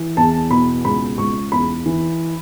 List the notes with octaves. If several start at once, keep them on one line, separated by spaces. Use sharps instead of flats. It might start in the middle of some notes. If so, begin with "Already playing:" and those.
Already playing: E3
E2 A5
B2 B5
C#2 B5
C#2 C#6
E2 B5
E3